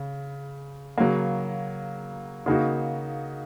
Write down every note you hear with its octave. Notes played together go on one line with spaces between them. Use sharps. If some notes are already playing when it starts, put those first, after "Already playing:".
Already playing: C#3
C#3 F#3 A#3
C#3 A#3 D#4 F#4